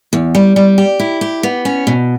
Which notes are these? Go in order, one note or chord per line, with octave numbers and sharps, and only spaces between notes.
E2
G3
G3
G4
E4
G4
B3
C#4
B2